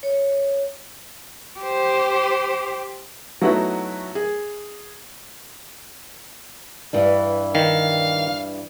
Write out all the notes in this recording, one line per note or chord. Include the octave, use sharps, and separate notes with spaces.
C#5
G4 C5
F#3 A3 B3 D#4 E4 F#4
G#4
G2 E3 G3
D#3 F5